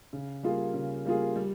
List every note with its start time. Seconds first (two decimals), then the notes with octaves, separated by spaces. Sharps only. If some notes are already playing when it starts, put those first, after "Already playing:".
0.13 C#3
0.43 G3 A#3 F4 G#4
0.74 C#3
1.05 G3 A#3 F4 G#4
1.36 G3